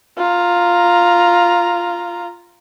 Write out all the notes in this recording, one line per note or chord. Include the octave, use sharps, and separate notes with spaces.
F4 A#5